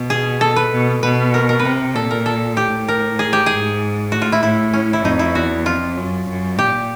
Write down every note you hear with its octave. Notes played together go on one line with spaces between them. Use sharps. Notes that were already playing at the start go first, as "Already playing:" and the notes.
Already playing: B2
G#4
A4
B4
B2
B2 B4
A#4
A#4
B4
C3 A#4
A#2 A4
A#4
A4
A2 G4
A#4
G#4
G4
G#2 G#4
A2 F#4
F4
E4
A2 E4
C#4
E4
F2 D#4
E4
E2 F#4
F2 F4
F#2
F#2
A#2 G4